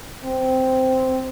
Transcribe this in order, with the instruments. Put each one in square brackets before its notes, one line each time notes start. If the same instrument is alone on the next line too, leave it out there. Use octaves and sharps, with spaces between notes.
[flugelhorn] C4